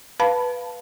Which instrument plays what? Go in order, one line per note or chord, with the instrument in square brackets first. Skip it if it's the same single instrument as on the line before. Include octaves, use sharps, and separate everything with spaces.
[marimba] B4 F5 A5 B5